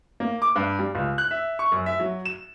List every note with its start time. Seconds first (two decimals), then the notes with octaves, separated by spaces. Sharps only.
0.20 A#3
0.42 D6
0.56 G2
0.79 G3
0.95 C#2
1.18 F#6
1.31 E5
1.59 C#6
1.72 F#2
1.86 E5
2.00 F#3
2.26 E7